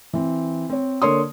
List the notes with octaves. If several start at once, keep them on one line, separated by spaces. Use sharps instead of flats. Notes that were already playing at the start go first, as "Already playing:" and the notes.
E3 C4
C4 C#5
D3 A#3 C#5 C6 D#6